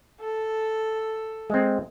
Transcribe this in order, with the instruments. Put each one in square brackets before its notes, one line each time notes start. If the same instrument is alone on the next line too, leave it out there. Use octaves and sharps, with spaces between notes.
[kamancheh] A4
[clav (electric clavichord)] G#3 C4